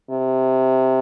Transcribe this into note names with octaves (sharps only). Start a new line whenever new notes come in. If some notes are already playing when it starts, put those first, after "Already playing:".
C3